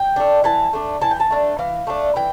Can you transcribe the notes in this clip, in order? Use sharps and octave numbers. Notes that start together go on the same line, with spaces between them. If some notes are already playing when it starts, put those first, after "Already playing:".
Already playing: G5
A3 D4
E3 A5
A3 D4
E3 A5
G5
A5
A3 D4
E3 F5
A3 D4
E3 G5